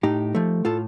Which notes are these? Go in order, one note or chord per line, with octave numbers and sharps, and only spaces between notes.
A2 D#4 G4
F3 A3
A2 F4 A4